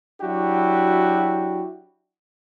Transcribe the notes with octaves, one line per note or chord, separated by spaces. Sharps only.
F#3 D4 E4 F#4 G4